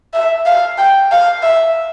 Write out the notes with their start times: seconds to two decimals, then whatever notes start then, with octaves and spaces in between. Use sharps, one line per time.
0.13 E5
0.46 F5
0.78 G5
1.11 F5
1.43 E5